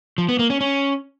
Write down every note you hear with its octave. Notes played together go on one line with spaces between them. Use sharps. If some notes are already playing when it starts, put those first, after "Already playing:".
F3
B3
A#3
C#4
C#4